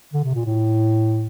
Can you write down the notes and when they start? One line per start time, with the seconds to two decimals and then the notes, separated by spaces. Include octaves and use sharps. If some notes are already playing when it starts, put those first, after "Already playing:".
0.13 D3
0.24 C3
0.35 A#2
0.46 A2